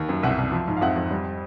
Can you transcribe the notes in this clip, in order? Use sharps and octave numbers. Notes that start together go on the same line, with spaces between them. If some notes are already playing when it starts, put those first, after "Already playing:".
Already playing: D#2
F#2
C2 E5 F#5
C2
F3
G#2
F5
F2 E5 F#5
F2
G3